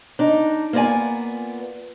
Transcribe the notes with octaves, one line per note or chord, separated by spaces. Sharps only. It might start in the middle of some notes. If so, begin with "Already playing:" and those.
D4 D#4
A#3 B3 F4 D5 G#5